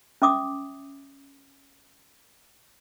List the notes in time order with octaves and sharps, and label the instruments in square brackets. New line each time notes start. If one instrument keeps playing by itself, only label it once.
[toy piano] C#4 E5 D6 D#6